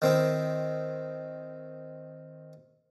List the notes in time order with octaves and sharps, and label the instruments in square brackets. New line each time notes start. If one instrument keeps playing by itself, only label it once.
[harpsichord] D#3 C4 E4